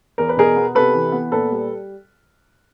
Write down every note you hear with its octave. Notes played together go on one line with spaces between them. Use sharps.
E2 A#4
B4
B2 G#4 A#4
B3
C3 A4 B4
E3
B3
A#2 A4 B4
G3